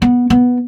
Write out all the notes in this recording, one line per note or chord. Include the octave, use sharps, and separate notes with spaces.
B3
B3